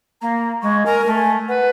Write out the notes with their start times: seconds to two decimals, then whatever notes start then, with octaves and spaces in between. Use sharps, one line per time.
0.22 A#3 A#5
0.62 G#3 C#6
0.86 A#4 G#5
1.06 A3
1.48 B4 F#5